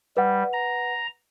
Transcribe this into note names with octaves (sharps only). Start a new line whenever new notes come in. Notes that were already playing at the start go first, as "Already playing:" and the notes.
G3 B4 F#5
A#5